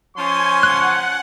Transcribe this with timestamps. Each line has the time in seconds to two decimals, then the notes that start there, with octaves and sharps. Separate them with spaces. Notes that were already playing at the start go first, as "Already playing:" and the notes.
0.17 F3 C#4 G#5 C6 C#6
0.63 F#5 F#6